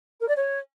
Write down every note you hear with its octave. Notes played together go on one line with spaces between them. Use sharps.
A#4
D5
C#5